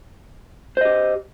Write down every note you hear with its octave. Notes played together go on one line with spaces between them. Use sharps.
G4 C5 D#5